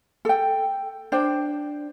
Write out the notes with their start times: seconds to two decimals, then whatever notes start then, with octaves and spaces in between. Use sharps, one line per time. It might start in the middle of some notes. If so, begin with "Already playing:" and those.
0.25 A4 G5
1.12 D4 C5 G5